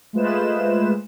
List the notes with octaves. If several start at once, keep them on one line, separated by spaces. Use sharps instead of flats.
G#3 A3 F4 B4 C5 E7